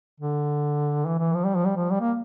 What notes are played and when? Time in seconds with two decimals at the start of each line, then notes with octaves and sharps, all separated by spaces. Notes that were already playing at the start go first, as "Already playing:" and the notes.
0.20 D3
1.06 E3
1.19 E3
1.34 F3
1.45 G3
1.56 F3
1.66 G3
1.76 F3
1.91 G3
2.01 A#3